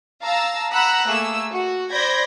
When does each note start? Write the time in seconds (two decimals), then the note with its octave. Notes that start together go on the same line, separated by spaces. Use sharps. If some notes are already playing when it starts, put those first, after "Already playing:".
0.22 F5 A5 A#5 E6
0.72 F#5 A#5 B5 E6 F#6 A#6
1.08 A3 A#3 G#4 E6
1.52 F#4
1.91 C5 D5 B5 G6 G#6 A#6